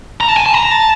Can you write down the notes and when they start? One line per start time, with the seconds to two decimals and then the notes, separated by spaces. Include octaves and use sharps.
0.21 A#5
0.28 A5
0.37 G#5
0.46 A5
0.54 A#5
0.71 A5